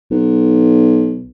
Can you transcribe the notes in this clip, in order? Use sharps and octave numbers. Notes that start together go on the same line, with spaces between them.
B1